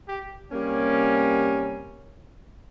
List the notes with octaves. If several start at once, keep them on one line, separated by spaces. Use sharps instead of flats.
G4
C3 G3 A#3 C#4